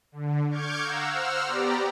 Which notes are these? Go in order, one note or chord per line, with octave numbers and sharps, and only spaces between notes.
D3
C#6 D6 F6 G6 G#6
F5 F#5 A#5 E6
C5 F#5 E6 F6
B3 G4 D5 A#5